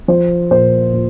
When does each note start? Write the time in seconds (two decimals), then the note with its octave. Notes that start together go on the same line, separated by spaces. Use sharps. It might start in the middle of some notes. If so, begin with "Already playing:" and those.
0.08 F3 C5
0.51 A#2 C5
0.93 A#2